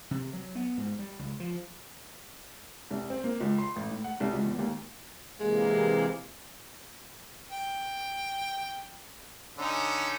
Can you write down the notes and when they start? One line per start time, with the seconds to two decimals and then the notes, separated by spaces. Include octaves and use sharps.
0.11 C3
0.34 F#3
0.55 B3
0.77 G#2
0.99 G3
1.19 C#2
1.40 F3
2.91 C2
3.10 C4
3.24 A#3
3.40 C#2
3.58 C6
3.76 A1
3.91 A2
4.04 F#5
4.20 C2
4.33 C#2
4.45 E2
4.59 D#2
5.40 C3 E3 G#3 A#3
7.51 G5
9.58 D3 C#4 D#4